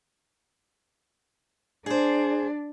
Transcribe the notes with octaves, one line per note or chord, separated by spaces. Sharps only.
D4 G#4 C5